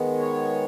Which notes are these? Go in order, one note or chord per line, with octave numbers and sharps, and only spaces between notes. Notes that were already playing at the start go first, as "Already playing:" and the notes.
Already playing: D#3 G#3 B3
C#5